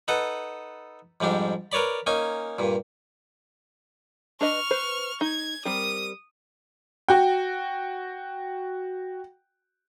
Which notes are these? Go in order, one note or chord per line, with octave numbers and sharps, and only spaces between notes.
D#4 A4 B4 F#5
F2 G#2 G3 D4
A#4 B4 C#5 D5 B5
A#3 C#4 D#4 G#5
G2 A#2
D4 B4 D#5 C#6 F6
B4 C5
D#4 G#6
G3 C4 A#4 D#6
F#4 G5